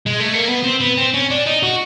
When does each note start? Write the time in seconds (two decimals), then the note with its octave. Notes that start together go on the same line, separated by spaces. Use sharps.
0.06 G#3
0.20 A3
0.34 A#3
0.47 B3
0.64 C4
0.81 B3
0.97 C4
1.14 C#4
1.30 D4
1.46 D#4
1.63 F#4